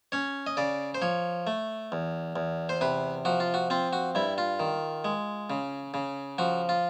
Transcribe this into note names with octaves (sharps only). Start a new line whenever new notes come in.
C#4 C#5
D#5
C#3 D5
C5
F3 C#5
A3
E2
E2
C5
C3 B4
F3 F#4
F4
F#4
C4 F4
F#4
G2 E4
F4
D#3
G#3
C#3
C#3
F3 F#4
F4